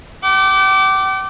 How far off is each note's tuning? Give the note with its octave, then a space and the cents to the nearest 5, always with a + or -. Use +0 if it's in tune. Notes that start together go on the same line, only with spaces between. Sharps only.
G5 -45 D6 +0